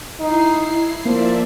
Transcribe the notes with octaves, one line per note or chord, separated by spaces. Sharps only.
D#4 E4 C7
F3 A#3 D5 E5